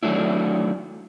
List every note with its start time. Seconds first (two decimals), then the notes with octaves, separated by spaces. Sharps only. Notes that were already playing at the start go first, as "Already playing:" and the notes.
0.03 D#3 F#3 A3 D4 E4